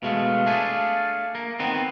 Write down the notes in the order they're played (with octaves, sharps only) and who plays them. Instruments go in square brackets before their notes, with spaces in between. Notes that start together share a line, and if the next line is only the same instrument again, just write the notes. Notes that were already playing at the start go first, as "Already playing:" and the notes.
[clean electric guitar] B2 G#3 A3 [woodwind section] F5
[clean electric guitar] A3 D4 G#4
A#3
D#3 B3 C4